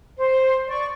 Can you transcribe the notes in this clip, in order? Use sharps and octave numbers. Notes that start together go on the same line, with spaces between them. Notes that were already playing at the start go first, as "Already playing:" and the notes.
C5
D5 C#6